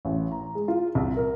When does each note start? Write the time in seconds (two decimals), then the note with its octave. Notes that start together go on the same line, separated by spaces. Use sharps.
0.05 A1
0.32 A#5
0.55 G#3
0.68 F4
0.95 C2
1.17 A#4